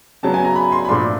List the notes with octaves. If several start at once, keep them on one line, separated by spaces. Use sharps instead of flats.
C#3 F#3 B3 A5
G#5
A#5
B5
C6
B5
A#2 F3 A3 D4 C6